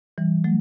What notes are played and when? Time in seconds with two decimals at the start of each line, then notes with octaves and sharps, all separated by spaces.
0.18 E3 G3
0.44 F#3 A3